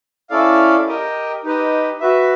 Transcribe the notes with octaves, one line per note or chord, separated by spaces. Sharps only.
C#4 E4 A4 D5 F5
G4 A#4 D#5 G5
D#4 G4 B4 D#5
F#4 B4 E5